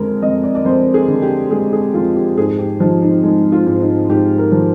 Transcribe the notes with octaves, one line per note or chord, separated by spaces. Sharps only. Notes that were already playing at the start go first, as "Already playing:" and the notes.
Already playing: F2 D3 G#3 A#4
F2 D#5
D5
D5
F2 C5
G#4
D3
G4
G#3 G#4
G#4
F2 F4
G4
G#2 G#4
G4
F3 D#4
D#4
G#3 D#4
F4
G#2
D#4
G#2 G4
A#4
F3